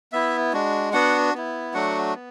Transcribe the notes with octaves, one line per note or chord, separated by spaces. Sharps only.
B3 E4 E5
G#3 D4 F#4
B3 D4 F#4 F#5
B3 E4
F#3 A3 D4 F#4 F#5
B3